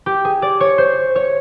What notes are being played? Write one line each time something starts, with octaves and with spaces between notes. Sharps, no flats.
G4
G#4
D5
C#5
C5
C#5